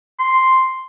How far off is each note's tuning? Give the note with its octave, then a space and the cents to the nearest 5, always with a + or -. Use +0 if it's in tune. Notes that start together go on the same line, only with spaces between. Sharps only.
C6 +0